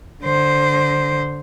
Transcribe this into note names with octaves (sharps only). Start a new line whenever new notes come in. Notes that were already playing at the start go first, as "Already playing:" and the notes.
D3 C5